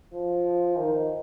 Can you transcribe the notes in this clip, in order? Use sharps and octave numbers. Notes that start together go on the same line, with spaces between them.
F3
D#3